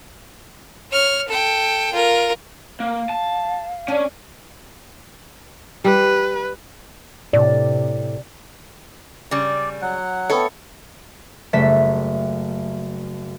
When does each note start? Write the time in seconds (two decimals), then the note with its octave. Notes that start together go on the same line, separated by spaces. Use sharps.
0.92 C#5 F6
1.28 A4 G5
1.93 F4 A#4
2.80 A#3 F5
3.09 A5
3.88 C#4 D4
5.84 G3 B4
7.33 A2 C3 D5
9.31 C#3 G3 D5
9.82 F#3 F#5
10.30 A3 B3 A4 C#5 G5
11.53 F#1 G3 A3 E5 B6